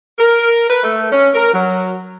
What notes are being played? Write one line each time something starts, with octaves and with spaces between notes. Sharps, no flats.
A#4
B4
A3
C#4
A#4
F#3